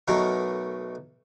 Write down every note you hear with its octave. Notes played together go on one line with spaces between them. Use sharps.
B1 B2 A3 A#4